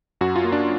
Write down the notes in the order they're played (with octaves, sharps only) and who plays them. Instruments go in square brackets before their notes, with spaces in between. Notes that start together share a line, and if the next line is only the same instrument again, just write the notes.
[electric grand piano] F#2 F#4
F4
A#3
D4